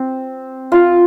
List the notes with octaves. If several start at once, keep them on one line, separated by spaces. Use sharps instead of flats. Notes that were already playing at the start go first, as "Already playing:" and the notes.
Already playing: C4
F4